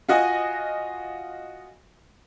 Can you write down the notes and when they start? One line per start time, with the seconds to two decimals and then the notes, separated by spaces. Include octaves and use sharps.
0.09 F4 F#4 D#5 G#5